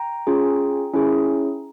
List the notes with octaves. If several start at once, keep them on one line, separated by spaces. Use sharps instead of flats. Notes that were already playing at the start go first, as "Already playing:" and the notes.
Already playing: G5 A#5
C#4 F4 G#4
C#4 E4 G#4